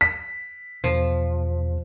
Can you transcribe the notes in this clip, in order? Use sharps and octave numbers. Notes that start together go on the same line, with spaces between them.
B6
E2 B2 F3